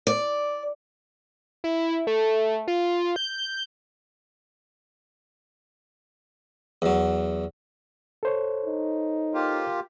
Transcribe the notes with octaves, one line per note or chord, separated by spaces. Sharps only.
D5
E4
A3
F4
G6
E2 F#3
A4 C5 C#5
D#4
A#3 F4 G4